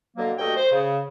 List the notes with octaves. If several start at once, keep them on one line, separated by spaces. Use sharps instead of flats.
B2 D3 F#3 A#3
G2 A3 F#4 D#5 G5
C5
C#3